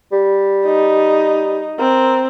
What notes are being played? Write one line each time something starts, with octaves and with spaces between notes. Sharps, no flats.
G3
D#4
C4 A#4